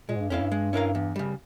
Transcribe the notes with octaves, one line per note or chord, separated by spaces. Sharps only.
A#2 G#3
G#2
G2
F2 C#4 E4 A#4 F5
G2
G#3
C#4 E4 A#4 F5
E2
C#3 G3